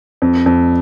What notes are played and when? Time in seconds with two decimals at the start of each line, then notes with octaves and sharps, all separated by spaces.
0.22 F2
0.46 F2